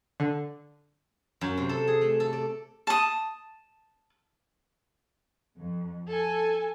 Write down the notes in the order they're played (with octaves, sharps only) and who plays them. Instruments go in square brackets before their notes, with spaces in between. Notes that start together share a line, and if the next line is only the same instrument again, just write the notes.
[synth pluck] D3
[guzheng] F#2
C3
A4
G#4
A3
A4
D5
[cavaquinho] A5 D#6
[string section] F2
A4 G#5